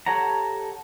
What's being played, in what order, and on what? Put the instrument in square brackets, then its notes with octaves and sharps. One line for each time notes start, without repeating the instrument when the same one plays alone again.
[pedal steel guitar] G4 A4 C#5 F#5 A#5